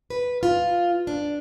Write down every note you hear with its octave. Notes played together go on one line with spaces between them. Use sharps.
B4
F4
D4